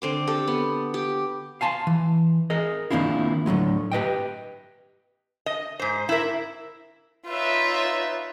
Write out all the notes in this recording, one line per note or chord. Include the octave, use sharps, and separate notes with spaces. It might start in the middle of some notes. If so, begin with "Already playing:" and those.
D3 C4 D6
G4 A4
B3
G4
F5 G#5 A5 C6
E3
G#4 A#4 D#5
D#3 A#3 C4 D4 E4 F4
A2 D3 F#3 G#3
G4 B4 D#5 G5
D#5
G#2 C5
E4 A#4 E5
D#4 F4 B4 C#5 E5